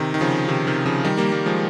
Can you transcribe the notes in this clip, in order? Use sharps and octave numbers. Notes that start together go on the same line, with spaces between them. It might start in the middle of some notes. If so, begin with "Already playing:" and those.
Already playing: C3 D#3
D#3
C#3 F3
C3 D#3
C3 D#3
C#3 F3
D#3 G3
G3 A#3
G3 A#3
F3 G#3